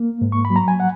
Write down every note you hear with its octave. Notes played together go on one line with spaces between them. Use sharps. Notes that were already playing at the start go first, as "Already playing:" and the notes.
Already playing: A#3
G#2
C#6
B5
F#3
A#5
G#5
F#5